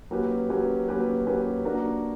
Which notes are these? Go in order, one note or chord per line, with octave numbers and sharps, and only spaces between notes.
F#3 A#3 C#4 G4 B4
F#3 A#3 C#4 G4 B4
F#3 A#3 C#4 G4 B4
F#3 A#3 C#4 G4 B4
A#3 D4 F#4 A#4